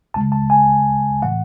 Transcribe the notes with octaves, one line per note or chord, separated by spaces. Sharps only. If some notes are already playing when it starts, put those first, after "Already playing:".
C#2 C#3 G#3 A5
A5
G#5
A2 E3 A3 F#5